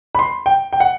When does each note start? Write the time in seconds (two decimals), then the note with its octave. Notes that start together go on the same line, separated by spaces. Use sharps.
0.15 B5
0.19 C6
0.46 G5
0.73 G5
0.80 F#5